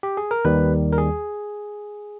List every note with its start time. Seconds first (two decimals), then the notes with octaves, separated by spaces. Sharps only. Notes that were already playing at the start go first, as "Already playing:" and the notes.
0.03 G4
0.17 G#4
0.31 A#4
0.45 D#2 D#3 G3 B4
0.93 A#4
0.98 G#4